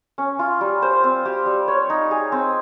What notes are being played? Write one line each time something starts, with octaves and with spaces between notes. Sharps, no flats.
C#4
F4
G3
C5
C4
G4
G3
C#5
D#4
G#4
C4